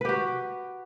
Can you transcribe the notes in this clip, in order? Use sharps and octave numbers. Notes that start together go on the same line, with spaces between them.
F#4 G4 B4